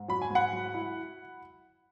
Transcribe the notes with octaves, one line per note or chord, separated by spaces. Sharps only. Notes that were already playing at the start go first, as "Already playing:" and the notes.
Already playing: G#2
F#3 B5
G#5
G#2
F#5 B5
F#3
E4